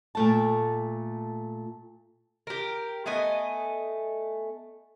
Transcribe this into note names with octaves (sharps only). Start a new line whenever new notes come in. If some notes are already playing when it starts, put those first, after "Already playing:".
A#2 A3 A5
G4 A#4
A3 B3 D#5 G#5